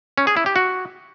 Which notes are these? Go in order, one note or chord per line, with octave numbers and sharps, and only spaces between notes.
C#4
G#4
E4
G4
F#4